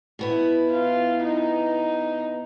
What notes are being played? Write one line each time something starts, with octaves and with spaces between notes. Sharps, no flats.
B2 B3 E4
F4
D#4